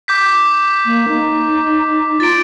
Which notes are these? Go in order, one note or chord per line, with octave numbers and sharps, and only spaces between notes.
D6 G6 B6
A#3
D#4
F4 A6 D7